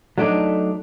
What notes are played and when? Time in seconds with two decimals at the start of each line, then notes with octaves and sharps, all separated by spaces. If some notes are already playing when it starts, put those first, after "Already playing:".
0.18 F#3 A3 D4 D#4